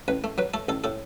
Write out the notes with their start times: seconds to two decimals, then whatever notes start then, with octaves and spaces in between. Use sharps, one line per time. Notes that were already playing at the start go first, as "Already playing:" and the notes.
0.08 A1 B4
0.24 A3
0.38 F#3 B4
0.54 A3 A4
0.69 A1 A4
0.84 A2 A4